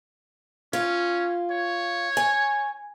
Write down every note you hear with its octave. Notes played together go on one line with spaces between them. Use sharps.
C#4 F4
C#5
G#5